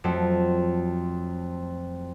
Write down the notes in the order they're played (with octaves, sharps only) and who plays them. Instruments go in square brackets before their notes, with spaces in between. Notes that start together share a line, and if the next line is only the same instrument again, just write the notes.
[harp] F2 F#3 A3